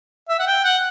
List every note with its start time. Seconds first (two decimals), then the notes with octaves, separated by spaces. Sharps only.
0.29 E5
0.39 F#5
0.47 G5
0.65 F#5